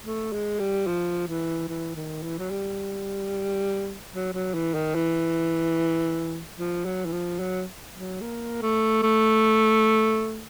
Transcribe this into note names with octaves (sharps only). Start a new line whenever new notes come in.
A3
G#3
G3
F3
E3
E3
D#3
E3
F#3
G3
F#3
F#3
E3
D#3
E3
F3
F#3
E3
F3
F#3
F#3
A#3
A3
A3